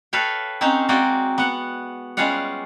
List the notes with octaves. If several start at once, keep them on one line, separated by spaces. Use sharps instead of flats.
A4 B4 C#5 F5 G5
C4 C#4 D#4 C#5 F5 F#5
G#3 A#3 C4 F#4 D5 D#5
B3 F#5
G3 G#3 C#4 F4 F5 F#5